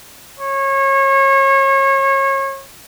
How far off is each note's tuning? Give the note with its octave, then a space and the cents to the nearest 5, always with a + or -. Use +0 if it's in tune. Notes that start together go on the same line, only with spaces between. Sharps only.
C#5 -30